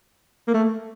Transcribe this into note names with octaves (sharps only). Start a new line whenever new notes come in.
A#3
A3